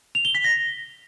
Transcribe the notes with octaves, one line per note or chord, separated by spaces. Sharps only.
F7
G7
B6
A#6